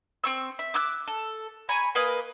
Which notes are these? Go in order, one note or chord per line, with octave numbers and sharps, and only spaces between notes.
C4 C#6 E6
E5
D6 E6 F#6
A4
C#5 G#5 A#5 B5
A#3 B4 D#5 G#5